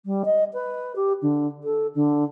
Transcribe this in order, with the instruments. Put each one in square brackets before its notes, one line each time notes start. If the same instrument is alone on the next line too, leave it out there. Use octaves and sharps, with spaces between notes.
[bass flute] G3
D#5
B4
G4
D3
A4
D3